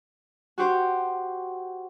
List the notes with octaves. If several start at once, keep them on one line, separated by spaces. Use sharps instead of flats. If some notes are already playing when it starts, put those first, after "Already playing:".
F#4 G4 C5